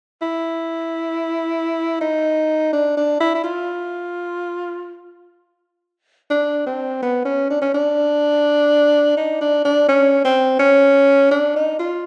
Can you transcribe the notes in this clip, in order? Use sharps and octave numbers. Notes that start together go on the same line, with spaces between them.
E4
D#4
D4
D4
E4
E4
F4
D4
C4
B3
C#4
D4
C#4
D4
D#4
D4
D4
C#4
C4
C#4
D4
D#4
F4